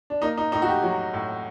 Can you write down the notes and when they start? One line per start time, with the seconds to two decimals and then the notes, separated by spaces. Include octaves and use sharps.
0.10 D4
0.22 A#3 D#4
0.38 D#4
0.52 A2 D#4
0.62 F#4
0.68 G4
0.83 F#3
1.14 A2